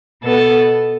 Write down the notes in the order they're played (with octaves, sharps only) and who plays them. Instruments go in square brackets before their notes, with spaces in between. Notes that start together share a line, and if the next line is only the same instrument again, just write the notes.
[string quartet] B2 B3 A4